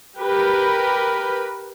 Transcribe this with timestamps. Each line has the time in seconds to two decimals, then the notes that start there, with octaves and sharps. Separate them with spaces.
0.18 G4 A#4 B4